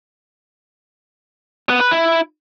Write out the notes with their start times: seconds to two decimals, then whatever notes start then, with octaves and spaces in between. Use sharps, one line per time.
1.70 B3
1.80 B4
1.91 E4